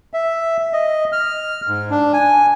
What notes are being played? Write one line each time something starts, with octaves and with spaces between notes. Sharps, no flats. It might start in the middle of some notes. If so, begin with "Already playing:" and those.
E5
D#5
F6
G#2
D4
G#5